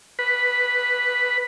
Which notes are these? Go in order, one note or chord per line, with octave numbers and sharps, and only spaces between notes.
B4